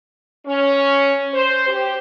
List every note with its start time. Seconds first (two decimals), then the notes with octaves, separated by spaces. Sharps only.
0.47 C#4
1.34 C5
1.68 G4